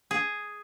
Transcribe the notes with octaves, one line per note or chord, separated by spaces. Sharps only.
G#4